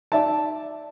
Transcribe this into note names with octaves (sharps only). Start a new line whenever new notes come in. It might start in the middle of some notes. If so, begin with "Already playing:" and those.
D5 E5 A5